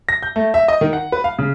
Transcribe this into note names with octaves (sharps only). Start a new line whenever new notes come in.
A#6
G6
A3
E5
D#5
D#3
F#5
B4
F5
C#3